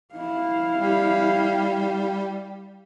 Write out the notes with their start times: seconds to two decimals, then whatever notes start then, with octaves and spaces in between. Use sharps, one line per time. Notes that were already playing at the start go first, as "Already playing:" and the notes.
0.14 E4 F5
0.78 G3